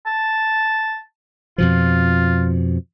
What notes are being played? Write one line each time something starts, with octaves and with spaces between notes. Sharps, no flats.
A5
F2 B2 F3 F4